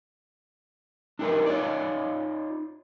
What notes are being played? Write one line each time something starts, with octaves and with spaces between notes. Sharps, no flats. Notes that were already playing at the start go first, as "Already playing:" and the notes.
D4 D#4 G4 A#4 B4
D#4 F4 C#5 D5